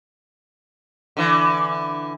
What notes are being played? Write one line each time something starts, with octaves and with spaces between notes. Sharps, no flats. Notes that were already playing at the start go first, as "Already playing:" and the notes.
D3 E3